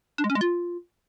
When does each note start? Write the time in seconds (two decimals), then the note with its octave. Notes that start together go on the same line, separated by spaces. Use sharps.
0.18 D4
0.24 G#3
0.30 C#4
0.35 G#3
0.41 F4